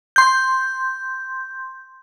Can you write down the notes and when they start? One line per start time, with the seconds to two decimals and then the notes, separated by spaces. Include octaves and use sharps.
0.16 C6 G6